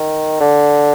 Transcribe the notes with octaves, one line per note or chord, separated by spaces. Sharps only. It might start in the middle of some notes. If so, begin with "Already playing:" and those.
Already playing: D#3
D3